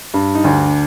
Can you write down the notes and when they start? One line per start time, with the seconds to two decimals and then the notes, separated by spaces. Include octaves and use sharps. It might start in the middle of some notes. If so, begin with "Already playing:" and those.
0.14 G2
0.35 D#4
0.44 D2 D4